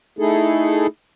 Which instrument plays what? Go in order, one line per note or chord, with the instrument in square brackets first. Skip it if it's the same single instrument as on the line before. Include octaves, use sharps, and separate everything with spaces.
[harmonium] A3 D#4 E4 G#4 A4